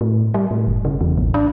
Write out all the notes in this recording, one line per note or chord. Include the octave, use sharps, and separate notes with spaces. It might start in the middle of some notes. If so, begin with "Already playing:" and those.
A2
G3
A2
F#1
C#3
E2
A1
D4